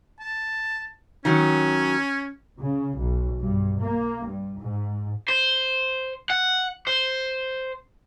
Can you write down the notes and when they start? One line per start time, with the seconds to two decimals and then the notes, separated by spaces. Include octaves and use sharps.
0.20 A5
1.25 D#3 F#3 C#4
2.58 C#3
2.97 B1
3.40 G2
3.80 A#3
4.26 G2
4.58 G#2
5.28 C5
6.30 F#5
6.87 C5